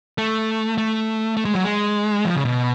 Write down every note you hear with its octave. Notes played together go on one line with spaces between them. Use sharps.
A3
A3
A3
G#3
F#3
G#3
F3
C#3
B2